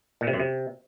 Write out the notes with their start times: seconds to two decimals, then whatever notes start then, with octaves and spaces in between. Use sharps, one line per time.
0.21 A#2
0.27 C3
0.33 F#2
0.40 C3